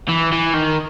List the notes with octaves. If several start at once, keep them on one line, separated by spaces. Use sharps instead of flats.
E3
E3
D#3